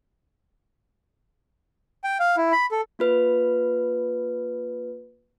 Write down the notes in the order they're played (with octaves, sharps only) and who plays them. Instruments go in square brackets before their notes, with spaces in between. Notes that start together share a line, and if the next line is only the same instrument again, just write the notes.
[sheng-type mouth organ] G5
F5
E4
B5
A4
[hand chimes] A#3 F4 B4